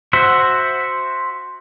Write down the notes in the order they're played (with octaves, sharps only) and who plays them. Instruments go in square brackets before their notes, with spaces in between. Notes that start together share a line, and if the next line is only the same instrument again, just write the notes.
[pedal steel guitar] F#4 C5 E5 F#5